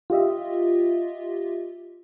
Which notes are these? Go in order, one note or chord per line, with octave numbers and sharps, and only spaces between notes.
F4 G4 D#5 E5